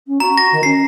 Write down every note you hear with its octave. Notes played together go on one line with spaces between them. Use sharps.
C#4
F#4 A#5
A#6
D#3
C#4 C7